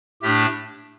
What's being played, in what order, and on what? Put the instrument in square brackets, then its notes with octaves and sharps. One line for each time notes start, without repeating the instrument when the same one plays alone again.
[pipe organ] A2 A3 D4 G4